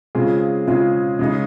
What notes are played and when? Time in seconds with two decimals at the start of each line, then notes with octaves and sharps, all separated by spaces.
0.15 C#3 G#3 C4 F4 G#4
0.68 C#3 G#3 C4 F4 G#4
1.19 C#3 G#3 D#4